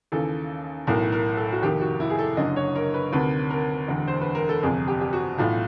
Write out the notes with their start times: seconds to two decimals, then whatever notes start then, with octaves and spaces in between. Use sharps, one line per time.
0.12 D#2 C#3 E3 A4
0.87 B1 A2 E3 A#4
1.12 A#4
1.37 A4
1.52 F#4
1.62 F1 D#2 D#3 G4
1.81 F#4
2.00 E4
2.10 G#4
2.19 A4
2.37 F#1 F#2 D3 D#5
2.56 C#5
2.75 A#4
2.94 B4
3.13 D2 C3 D#3 B4
3.50 A#4
3.88 E1 D2 D3
4.08 C5
4.21 B4
4.35 A#4
4.49 A4
4.62 G1 F2 C3 G#4
4.88 G4
5.01 G4
5.13 F#4
5.38 B1 A2 E3 F4